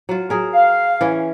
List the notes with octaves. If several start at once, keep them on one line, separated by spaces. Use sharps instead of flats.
F#3 F4
F#3 G#4 A#4
F5
E3 C#4